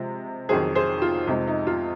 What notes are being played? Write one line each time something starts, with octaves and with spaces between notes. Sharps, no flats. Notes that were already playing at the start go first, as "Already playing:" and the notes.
Already playing: C3 F3 G#3
F2 D#3 F#3 G#4 C5
G#4 C5
F4
F2 C3 F3 G#3 D#4
D#4
F4